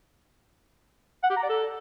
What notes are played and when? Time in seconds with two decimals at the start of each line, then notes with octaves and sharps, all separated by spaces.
1.23 F#5
1.30 G4
1.36 A#5
1.43 D5
1.49 A4